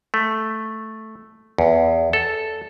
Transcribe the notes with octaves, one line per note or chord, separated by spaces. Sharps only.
A3
E2
A4